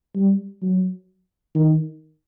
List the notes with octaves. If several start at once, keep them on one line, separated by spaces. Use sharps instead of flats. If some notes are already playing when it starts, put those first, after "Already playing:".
G3
F#3
D#3